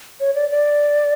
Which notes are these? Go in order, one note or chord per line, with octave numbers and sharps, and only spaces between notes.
C#5
D5
D5